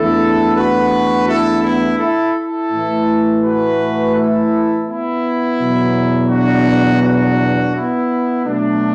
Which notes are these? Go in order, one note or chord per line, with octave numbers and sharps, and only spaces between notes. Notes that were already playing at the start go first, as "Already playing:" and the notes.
Already playing: E2 D3 A3 E4 A4
F#4 B4
E4 A4
B3 E4
E4 A4
E4 A4
A2 E3 A3
F#4 B4
E4 A4
B3 E4
E2 B2 F#3
D4 F#4
D4 F#4
B3 E4
B2 F#3 A3 D4